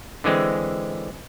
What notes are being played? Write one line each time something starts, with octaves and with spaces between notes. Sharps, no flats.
D3 E3 G#3 C4